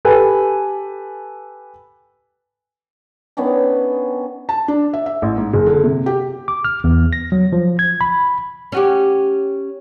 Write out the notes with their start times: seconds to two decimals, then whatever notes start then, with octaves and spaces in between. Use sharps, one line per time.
0.05 G4 A4 B4 G#5
3.37 D#3 B3 C#4 D4
4.49 A5
4.68 D4
4.93 E5
5.06 E5
5.22 A1
5.38 G#2
5.53 F#1
5.67 D3
5.84 C3
6.06 G4
6.48 D6
6.65 F6
6.84 E2
7.13 A#6
7.32 F#3
7.53 F3
7.79 G#6
8.01 B5
8.72 C#4 F#4 G4